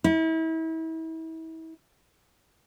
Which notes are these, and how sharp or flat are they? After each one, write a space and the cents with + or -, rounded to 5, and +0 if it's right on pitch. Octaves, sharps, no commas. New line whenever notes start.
E4 -35